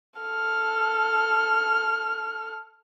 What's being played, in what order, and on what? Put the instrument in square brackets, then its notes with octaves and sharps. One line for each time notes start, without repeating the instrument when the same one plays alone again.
[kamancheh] A4 F6